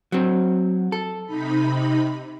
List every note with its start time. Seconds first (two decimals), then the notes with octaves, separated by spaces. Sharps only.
0.12 F#3 C4
0.92 A4
1.26 C3 D#4 B5